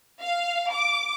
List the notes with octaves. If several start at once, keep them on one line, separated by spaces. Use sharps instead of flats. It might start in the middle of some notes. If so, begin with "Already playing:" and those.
F5
D6